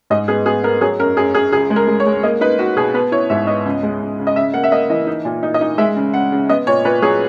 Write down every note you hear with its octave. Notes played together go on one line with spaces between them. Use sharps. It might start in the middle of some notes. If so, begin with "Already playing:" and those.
G#2 D#5
B3 G#4
B3 G#4
B3 A#4
F#3 G#4
F#2 A#4
F#2 G#4
F#2 G#4
C#2 G#4
G#3
A#4
G#3
C#5
G#3
A#3 D#5
D#4 B4
D#4 F#4
B2 G#4
B3 B4
E4 C#5
G#2 E5
B3 D#5
C#2
G#3
C#2
C#3
D#5
C#3 E5
A#3 F#5
E5
A#3 D#5
E3 D#5
D#4
A#2
D#4
D#5
D#4
G#3 E5
C#3
C#3 F#5
C#3
B3 D#5
A#2 C#5
A#2 B4
F#3 G#4